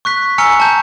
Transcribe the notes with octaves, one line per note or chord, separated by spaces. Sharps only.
C#6 F#6 B6
G#5 A#5 E6 F6 C#7
A5 G6